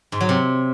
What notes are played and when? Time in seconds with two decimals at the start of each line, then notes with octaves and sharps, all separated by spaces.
0.12 G#2
0.21 F#3
0.29 C3